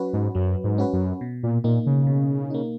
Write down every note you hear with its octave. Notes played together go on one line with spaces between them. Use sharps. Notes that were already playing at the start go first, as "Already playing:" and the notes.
Already playing: F#3 C#4 F#4 B4
G#2
F#2 F#3
G#2
C#4 F#4 B4
F#2
B2
A#2
A#2 A#3 D#4
C#3
B2
A#3 D#4